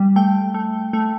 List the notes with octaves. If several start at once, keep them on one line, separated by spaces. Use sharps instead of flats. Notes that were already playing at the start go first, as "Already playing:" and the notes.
Already playing: G3
A3 G5
A3
A3